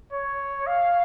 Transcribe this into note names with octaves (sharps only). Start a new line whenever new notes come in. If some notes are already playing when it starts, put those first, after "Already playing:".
C#5
F5